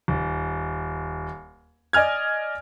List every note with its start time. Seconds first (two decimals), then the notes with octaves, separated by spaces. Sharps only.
0.08 D#1
1.93 D5 D#5 G#5 F6 G#6